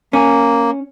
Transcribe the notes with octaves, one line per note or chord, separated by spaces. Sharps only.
A#3 C#4